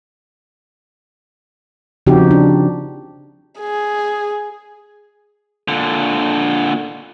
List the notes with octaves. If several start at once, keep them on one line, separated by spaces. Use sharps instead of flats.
C#3 F3 C4 D#4 F#4 G4
D4
G#4
A#2 D3